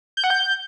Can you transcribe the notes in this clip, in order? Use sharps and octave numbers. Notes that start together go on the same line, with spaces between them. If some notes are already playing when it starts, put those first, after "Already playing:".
G6
F#5
G6